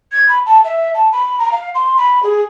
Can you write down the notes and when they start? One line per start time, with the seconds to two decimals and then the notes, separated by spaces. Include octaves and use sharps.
0.12 G#6
0.28 B5
0.46 A5
0.64 E5
0.94 A5
1.12 B5
1.38 A#5
1.52 F5
1.74 C6
1.97 B5
2.23 G#4